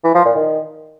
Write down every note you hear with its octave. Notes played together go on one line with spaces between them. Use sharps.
E3
F3
A#2
D#3